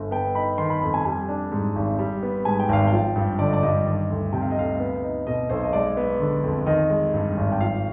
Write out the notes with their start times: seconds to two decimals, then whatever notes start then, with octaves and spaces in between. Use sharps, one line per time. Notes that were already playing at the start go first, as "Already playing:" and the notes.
Already playing: G1
0.11 B3 G5
0.35 D#4 B5
0.58 D#3 C6
0.70 B5
0.81 F2 B5
0.94 G#5
1.05 G3 G#5
1.29 D4
1.52 G#2
1.76 G#1
1.99 G3
2.23 B3
2.45 G#2 G#5
2.60 G5
2.69 G#1 F5
2.87 G5
2.93 F3
3.16 G2
3.39 D3 D5
3.46 D#5
3.53 D5
3.63 G2 D#5
3.86 D#3 D#5
4.10 D2
4.32 C3 G5
4.42 F5
4.50 D#5
4.56 D2 F5
4.80 B3
5.03 D#4
5.27 B2 D#5
5.49 B1 C5
5.63 D#5
5.73 G#3 D5
5.97 B3
6.20 D3
6.43 F2
6.66 D#3 D#5
6.90 G#3
7.14 G2
7.37 G#1
7.52 G5
7.61 F3 F5